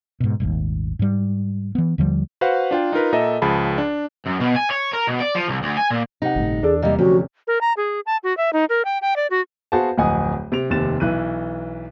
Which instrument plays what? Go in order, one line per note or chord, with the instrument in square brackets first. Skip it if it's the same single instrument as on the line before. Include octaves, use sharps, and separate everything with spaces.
[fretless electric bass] G#2 B2
D#1 G#1 D#2
G#2 G3
E3 B3
D#2 D3 F3 G3
[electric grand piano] F#4 B4 C5 F5 F#5
D4 F4 G5
D#4 F4 A#4 B4
A#2 A4 D#5 E5 A#5
C#2 F3 G#4 A5 B5
D4
[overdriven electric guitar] F#2
B2
G#5
C#5
A#4
B2
D5
F3
C2
D2
G#5
A#2
[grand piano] C3 F#5 [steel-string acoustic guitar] D#4
[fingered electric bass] G1 A2
[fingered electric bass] E2 [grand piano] D4 A4 D5 [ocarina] G#4
[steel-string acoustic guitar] C3 G3 [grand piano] A#3 [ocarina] D#5
[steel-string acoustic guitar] D2 [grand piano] C3 F#3 C#4 [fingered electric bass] F3 [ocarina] F#4
[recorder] A#4
A#5
G#4
A5
F#4
E5
D#4
A#4
G5
G5
D5
F#4
[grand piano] B3 F#4 G#4 C5 F5 A5
D1 F2 D#5 F#5 G#5 D#6
C3 D7 F7
F1 D#2 C3 A6 E7
B1 E3 F#6 D#7